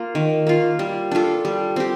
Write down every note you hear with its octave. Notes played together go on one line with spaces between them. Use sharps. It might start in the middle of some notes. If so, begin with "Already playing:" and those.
Already playing: A#3 F4
D#3
A#3 F4
G3
D4 F4 A4
G3
C4 G4